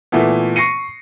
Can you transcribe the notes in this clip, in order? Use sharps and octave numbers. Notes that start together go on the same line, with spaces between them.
A#2 E3 A3 B3
C#6 A#6 C7 C#7 D#7